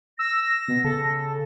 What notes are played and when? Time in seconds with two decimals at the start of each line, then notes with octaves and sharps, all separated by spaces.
0.19 E6 A#6
0.68 B2
0.84 C#3 A4